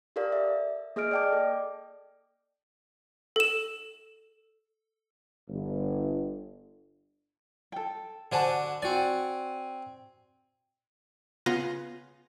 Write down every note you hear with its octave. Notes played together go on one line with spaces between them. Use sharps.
G4 A4 A#4 D5 F5
E5
A#3 G#4 D#5 F6 D7
D5 D#5 G5 A5 D6
A4
A4 E7
G1
A4 G5
D3 D4 F#4 C5 G#5 A5
C4 F#4 D5 G#5
C#3 B3 F4 A#6 D#7